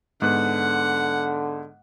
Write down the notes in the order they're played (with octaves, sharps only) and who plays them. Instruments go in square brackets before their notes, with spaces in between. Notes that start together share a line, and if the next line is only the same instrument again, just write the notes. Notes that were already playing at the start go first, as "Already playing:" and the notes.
[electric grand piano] G#2 B3 F#6 [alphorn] D3 [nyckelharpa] F#5